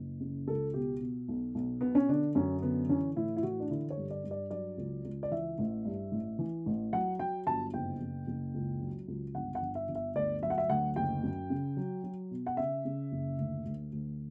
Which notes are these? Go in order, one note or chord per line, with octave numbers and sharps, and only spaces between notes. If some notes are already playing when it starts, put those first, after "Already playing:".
Already playing: F#1
C#3
C#2 A4
B2 G4
B2
B1
B1
B2 B3
C#4
D3 D4
F#2 C#4
D3 B3
E3 C#4
A2 E4
E4
E3 F#4
D4
D3 E4
C#5
G2
D5
G2
D5
F#3 D5
C#2
C#2
D5
E3 E5
A1
G2
A1
E3
A1
F#3 F#5
F#3 G5
G1 A5
F#1 G5
F#1
F#1
C#2
F#3
C#2
G1 F#5
F#5
G1
E5
G1
E5
D2 D5
F#3 E5
F#5
E5
D2 F#5
F#1 G5
F#2
C#3
F#3
F#3
B2
F#5
C#3 E5
C#3
F#1
D2
D2
D2